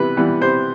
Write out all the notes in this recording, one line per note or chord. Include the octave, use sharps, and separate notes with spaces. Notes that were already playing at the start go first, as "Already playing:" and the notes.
Already playing: C3 E3 G3 B3 B4
E3 G3 B3
C3 C5